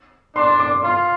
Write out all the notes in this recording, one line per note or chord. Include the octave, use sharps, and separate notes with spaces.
D4 C6
D6
F4 C6